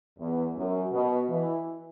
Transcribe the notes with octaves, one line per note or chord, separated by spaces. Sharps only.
E2
F#2
B2
E3